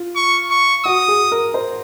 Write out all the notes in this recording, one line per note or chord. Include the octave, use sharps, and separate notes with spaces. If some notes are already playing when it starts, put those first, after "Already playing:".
Already playing: F4
C#6
C#6
F#4 D#6
G#4
A#4
C5